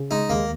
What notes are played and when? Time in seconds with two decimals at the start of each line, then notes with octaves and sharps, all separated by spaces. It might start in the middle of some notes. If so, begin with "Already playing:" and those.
Already playing: C#3
0.11 G#3 D#4
0.29 D#2 A#3